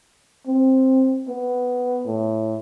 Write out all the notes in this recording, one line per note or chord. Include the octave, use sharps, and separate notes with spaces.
C4
B3
A2